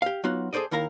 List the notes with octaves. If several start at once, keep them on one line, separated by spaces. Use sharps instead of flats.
G4 F5
F#3 B3 D#4 F4 F#4
G#4 A4 C5 D5 D#5
D#2 D#3 E4 A#4 F5 A#5